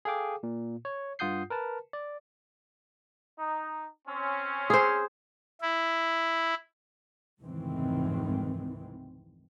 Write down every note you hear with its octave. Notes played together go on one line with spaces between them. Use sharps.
G#4 A4 F5 G5 D6
A#2
C#5
G2 F4 F#5 D#6 G6 C7
A#4 B4 A5
D5
D#4
C4 C#4
G#4 C5
E4
F1 C#2 G#2 D#3 E3 C4